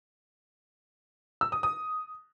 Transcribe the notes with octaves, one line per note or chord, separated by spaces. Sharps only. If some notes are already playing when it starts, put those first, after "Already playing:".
E6
D#6
D#6